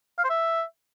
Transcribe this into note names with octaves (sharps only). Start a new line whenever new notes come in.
F5
C5
E5